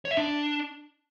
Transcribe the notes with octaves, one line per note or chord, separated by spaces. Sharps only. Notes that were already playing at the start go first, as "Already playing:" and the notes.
C#5
E5
D4